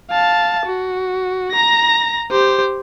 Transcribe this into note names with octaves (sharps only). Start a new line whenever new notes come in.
F5 A5
F#4
A#5 A#6
G4 C5